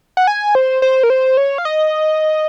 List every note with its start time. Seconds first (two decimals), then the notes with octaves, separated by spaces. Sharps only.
0.17 F#5
0.27 G#5
0.55 C5
0.82 C5
1.03 A#4
1.10 C5
1.37 C#5
1.58 F5
1.65 D#5